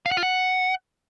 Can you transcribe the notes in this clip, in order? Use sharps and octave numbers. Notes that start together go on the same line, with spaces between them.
F5
F#5
F4
F#5